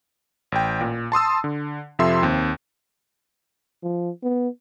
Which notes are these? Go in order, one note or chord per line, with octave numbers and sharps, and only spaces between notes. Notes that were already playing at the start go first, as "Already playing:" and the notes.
A1 G5
A#2
A5 C6 D#6 E6
D3
F2 C3 F3 A4 E5 C6
D#2 C4
F3
B3